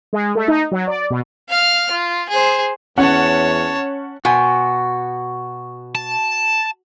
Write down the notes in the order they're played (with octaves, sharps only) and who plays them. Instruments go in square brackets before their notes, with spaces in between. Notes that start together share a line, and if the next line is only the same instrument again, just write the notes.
[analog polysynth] G#3
A3
D#4
F#3
D5
B2
[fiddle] F5 F6
F4
G#4 C5
[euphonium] E2 [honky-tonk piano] C#4 F#5 [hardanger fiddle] C#5 A5
[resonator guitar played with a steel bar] B2 [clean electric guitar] F#4 [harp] G#5 C6
[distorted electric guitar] A5